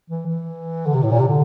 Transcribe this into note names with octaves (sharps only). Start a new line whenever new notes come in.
E3
E3
D3
C3
A2
A#2
C3
D3